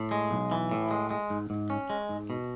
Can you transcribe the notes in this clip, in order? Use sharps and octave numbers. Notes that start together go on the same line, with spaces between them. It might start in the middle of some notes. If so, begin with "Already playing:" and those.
Already playing: A2
G#3
B1
E3
A2
G#3
G#3
G#2
G#2
C#4
G#3
G#2
B2